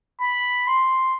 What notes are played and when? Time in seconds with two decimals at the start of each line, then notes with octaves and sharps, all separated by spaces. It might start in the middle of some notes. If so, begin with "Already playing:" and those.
0.21 B5
0.67 C6